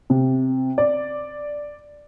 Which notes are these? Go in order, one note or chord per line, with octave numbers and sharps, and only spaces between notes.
C3
D5